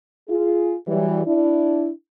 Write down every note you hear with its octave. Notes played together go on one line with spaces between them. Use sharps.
F4 G#4
E3 F#3 G3
D4 E4